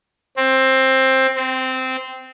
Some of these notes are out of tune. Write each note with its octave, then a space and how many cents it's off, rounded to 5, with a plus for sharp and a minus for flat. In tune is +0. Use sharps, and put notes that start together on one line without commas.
C4 +15
C4 -10